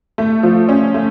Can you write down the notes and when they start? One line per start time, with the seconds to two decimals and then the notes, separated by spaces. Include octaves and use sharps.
0.18 A3
0.43 F3
0.69 C#4
0.94 A3